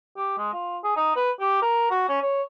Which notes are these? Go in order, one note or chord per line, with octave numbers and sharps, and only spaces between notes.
G4
G#3
F4
G#4
D#4
B4
G4
A#4
F#4
C#4
C#5